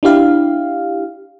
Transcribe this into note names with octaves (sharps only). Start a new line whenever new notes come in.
D4 E4 G4 F5